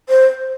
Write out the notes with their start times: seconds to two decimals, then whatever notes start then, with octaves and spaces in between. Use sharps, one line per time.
0.09 C5